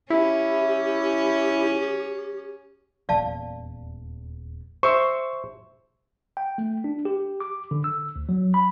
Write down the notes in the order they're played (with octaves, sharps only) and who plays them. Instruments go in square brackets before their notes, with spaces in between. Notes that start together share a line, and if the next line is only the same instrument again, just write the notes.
[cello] C#4 [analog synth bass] E4 [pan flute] G4
[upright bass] D#1 E2 [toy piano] D5 F5 A5
[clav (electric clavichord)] C5 E5 [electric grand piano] C#6
[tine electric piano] G5
A3
D4
G4
D6
D3
E6
D2
F#3
B5